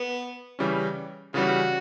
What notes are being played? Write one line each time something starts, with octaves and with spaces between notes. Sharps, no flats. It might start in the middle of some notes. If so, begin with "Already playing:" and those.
Already playing: B3
C#3 E3 G3 C#4
C#3 E3 G3 B3 C#4 F#4